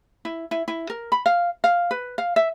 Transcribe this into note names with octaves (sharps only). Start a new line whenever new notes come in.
E4
E4
E4
A#4
B5
F5
F5
B4
F5
E5